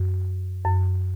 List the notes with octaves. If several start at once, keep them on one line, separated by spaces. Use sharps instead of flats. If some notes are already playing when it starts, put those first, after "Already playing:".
Already playing: F#2
F#2